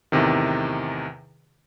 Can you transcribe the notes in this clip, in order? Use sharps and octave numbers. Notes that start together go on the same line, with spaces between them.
E2 A2 C3 D#3